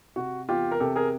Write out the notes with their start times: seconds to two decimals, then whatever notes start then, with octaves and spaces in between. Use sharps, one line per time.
0.16 C3 F#4
0.48 E2 F4 G4
0.71 A#4
0.80 C3 G4 A4
0.96 G#4 A#4